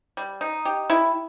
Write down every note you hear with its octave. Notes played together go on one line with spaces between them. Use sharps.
G3
D#4
G4
E4